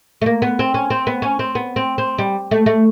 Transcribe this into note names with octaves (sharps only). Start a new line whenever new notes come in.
A3
A#3
B3
C4
C#4
C4
B3
C#4
C4
B3
C4
C4
G3
A3
A3